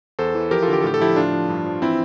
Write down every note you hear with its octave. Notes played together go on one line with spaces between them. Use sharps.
E2 A4 C5
E3
F3 G4 A#4
F4 A4
D3
G4
A4
A2 G4
A4
F3 E4 G4
A2 D4 F4
F3
G2
F3
E3 C4 E4